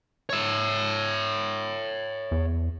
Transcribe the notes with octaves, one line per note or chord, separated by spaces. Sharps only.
C#5 E5
E2